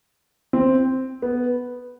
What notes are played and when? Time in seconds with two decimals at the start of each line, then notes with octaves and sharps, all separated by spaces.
0.53 C4
1.22 B3